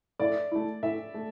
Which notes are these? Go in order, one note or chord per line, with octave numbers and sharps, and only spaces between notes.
A2 D5
A3 E4
A2 E5
A3